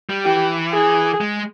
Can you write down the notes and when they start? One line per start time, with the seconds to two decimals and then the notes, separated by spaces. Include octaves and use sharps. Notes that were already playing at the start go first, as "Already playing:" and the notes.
0.09 G3
0.25 E3 G4
0.73 G#4
1.21 G#3